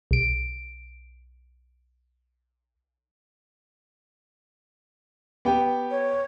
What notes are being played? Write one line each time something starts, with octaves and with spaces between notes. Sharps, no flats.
B1 D7
B3 G4 G5
C#5